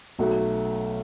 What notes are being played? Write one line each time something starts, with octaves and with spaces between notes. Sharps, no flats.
B1 B2 F#3 A3